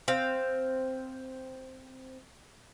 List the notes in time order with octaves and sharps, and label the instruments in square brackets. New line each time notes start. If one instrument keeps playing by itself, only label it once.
[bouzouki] C4 F5